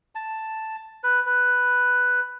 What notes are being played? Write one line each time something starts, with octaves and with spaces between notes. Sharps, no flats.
A5
B4
B4